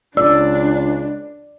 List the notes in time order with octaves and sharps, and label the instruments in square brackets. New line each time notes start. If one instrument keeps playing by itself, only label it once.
[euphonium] C#2 [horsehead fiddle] D4 [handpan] D5 [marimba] E6